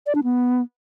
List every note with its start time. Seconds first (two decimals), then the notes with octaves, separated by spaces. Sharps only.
0.06 D5
0.15 D4
0.24 B3